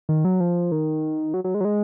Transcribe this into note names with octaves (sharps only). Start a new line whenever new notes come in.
D#3
F#3
F3
D#3
F#3
F#3
G#3
F#3
G#3